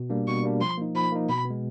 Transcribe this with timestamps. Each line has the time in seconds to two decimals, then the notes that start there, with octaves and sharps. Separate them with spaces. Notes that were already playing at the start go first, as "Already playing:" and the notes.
Already playing: B2
0.10 G3 A#3 D4
0.28 B2 C#6
0.43 G3 A#3 D4
0.61 F3 C6
0.77 A#3 D#4
0.95 F3 B5
1.12 A#3 D#4
1.29 B2 B5
1.45 B3
1.50 G#3